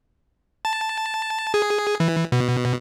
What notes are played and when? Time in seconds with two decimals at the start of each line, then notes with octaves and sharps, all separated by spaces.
0.65 A5
1.54 G#4
2.00 E3
2.32 B2